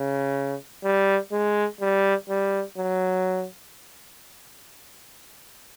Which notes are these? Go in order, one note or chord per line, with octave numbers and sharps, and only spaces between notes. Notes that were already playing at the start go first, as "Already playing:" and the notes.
Already playing: C#3
G3
G#3
G3
G3
F#3